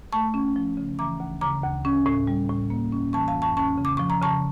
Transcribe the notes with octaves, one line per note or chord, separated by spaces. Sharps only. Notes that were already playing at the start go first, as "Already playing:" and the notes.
A3 A5 C#6
C#4
F3
C#3
E3 A#5 D6
D2
C#3 A#5 D6
D2
C#4
A2
G3
A2
A#3
C#4
E3 A5 C#6
F5 A5
F2
A5 C#6
C#4 A5 C#6
C#3
D6
F3 C#6
A#5
C#3 A5 C#6